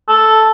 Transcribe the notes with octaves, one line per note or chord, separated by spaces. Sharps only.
A4